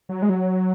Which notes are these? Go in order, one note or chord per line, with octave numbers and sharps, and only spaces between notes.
F#3
G#3
F#3